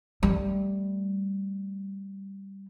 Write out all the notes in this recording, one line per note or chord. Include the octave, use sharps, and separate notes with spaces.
G3 A3